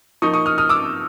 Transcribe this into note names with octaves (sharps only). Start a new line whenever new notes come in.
F3 A#3 D#4 C#6 D#6
C#6 D#6
D#6 F6
D#6 F6
D6 E6